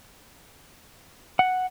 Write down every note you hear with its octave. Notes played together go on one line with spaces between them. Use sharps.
F#5